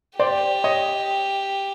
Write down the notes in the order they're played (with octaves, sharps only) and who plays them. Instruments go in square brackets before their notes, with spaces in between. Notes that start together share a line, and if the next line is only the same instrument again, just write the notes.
[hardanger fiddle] G4 [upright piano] C5 D5
[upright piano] C#5 D#5